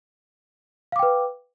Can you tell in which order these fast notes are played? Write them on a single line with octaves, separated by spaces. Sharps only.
F5 D6 G5 B4